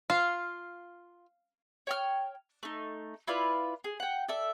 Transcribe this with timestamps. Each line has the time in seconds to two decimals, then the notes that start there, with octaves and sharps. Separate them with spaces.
0.10 F4 F5
1.87 C#5 G5 F6
2.63 A3 D#4
3.27 E4 F4 B4 D5
3.84 G#4
4.00 F#5 G5
4.29 A4 D5 E5